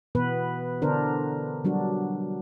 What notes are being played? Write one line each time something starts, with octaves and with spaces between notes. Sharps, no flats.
B2 E3 B3 B4
D3 B3 D4 A#4 C5
F#3 G3 D4 F#4